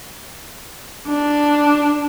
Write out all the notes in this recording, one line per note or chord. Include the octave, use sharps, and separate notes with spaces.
D4